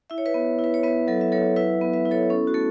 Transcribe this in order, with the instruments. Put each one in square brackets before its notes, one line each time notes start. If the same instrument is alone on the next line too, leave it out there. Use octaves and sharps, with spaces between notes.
[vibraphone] E4 E5
C#5
B4 E5
B3
E4
B4
C#5
B3 B4 E5
F#3 A4
E5
F#3 A4 C#5
E4 B4 E5
B3
B4 E5
E4
A4 C#5
C#4 A4
F#4
A3 A4